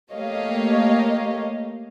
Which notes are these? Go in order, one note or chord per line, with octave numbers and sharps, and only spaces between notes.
A3 A#3 G4 C#5 D#5 F5